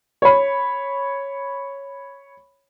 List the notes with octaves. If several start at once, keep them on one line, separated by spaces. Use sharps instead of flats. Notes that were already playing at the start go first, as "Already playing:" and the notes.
C#5 B5